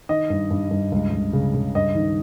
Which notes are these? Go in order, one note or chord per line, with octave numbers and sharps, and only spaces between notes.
D#3 D#5
G2
G2
G2
C#2
C#2
C#3
C#3
G2 D#5
D#3